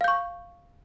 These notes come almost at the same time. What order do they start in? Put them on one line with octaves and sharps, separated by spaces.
F5 G6 C#6